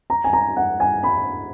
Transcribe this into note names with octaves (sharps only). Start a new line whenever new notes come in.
A#5
G#5
A#5
F#5
G#5
B5